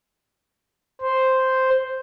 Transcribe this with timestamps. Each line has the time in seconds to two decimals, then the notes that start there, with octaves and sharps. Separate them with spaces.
1.02 C5